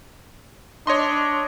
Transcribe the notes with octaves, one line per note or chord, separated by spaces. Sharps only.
D4 C#5 D#5 C6